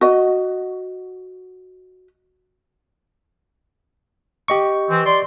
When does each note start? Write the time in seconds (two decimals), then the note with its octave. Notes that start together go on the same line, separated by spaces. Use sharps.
0.01 F#4 D#5
4.48 G4 D#5 C#6
4.90 E3 C4
5.06 D5 C6